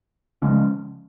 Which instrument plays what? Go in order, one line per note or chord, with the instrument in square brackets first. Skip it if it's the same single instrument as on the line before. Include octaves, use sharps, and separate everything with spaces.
[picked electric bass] C#3 F3 G#3 C#4